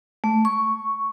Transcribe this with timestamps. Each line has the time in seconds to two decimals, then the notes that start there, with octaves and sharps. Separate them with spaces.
0.24 A3
0.45 C#6